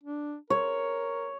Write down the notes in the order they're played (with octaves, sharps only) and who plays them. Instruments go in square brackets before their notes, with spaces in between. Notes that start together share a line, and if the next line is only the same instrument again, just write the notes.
[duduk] D4
[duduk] A#4 [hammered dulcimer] C#5